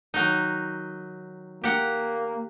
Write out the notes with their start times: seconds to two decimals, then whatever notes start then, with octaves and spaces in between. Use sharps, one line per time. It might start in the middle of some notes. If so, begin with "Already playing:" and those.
0.14 D#3 F#3 D#4
1.64 A#3 G4 F#5 A#5